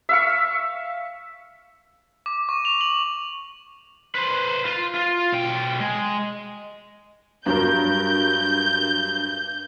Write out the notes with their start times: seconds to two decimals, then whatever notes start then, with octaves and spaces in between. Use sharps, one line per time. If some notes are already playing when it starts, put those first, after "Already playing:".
0.09 E5 F5 C#6
2.26 D6
2.49 C#6
2.65 F7
2.81 F#7
4.15 B4 C5
4.65 F4
4.95 F4
5.32 B1 G5
5.80 G#3
7.46 G2 F#3 A#4 G6